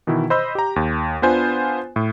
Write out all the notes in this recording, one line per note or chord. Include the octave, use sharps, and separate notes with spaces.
B2 D#3 E3 E4
C5 D#5 B5 E6 G6
G4 A#5
D#2
B3 D4 F4 B4 C5 G#5
A2